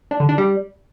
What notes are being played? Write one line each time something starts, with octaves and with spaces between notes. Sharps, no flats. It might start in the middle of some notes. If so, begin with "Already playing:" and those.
D4
D3
D4
G3